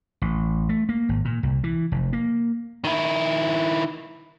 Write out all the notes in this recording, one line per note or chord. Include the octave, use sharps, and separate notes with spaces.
A1
A3
A#3
G#1
A#2
C2
E3
F1
A#3
D#3 E4